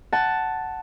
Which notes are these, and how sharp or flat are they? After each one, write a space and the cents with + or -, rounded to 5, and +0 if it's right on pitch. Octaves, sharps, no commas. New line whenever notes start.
F#5 +10 A5 +0